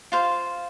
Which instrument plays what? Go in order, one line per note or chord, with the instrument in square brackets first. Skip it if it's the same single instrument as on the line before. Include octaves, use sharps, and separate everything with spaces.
[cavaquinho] F4 C5 F5